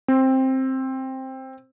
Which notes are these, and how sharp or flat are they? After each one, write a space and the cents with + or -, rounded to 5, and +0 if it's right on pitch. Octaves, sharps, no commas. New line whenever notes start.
C4 +10